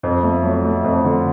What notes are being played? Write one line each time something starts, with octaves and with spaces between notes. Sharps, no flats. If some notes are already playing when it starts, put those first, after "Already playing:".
F2
A3
F#3
A3
F2
D3